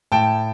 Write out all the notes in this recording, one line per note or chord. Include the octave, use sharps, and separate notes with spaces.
A2 G5 A5